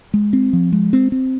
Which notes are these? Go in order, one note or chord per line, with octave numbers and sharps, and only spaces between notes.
G#3
C4
F3
G#3
C4
C4